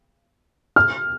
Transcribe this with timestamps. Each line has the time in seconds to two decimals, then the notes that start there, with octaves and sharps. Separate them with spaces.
0.76 F6